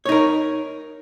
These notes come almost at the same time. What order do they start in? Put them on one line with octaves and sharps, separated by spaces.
C#5 D#4 A#4